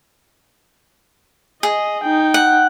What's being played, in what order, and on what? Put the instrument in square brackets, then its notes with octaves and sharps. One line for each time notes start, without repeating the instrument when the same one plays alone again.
[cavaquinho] G#4 [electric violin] D#5
[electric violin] D#4 G5
[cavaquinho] F#5